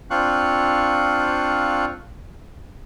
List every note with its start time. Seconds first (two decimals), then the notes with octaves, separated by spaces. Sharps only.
0.11 C4 D4 F4 F5 C#6 F#6